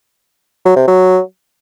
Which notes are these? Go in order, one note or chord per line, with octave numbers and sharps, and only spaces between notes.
F#3
C3
F#3